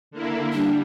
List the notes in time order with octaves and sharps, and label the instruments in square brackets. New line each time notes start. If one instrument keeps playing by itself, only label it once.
[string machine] D3 A#3 E4
[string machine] G3 [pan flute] D4